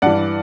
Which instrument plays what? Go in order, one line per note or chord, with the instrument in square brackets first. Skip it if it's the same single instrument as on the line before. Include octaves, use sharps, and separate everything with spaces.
[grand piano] G2 E3 D5 F#5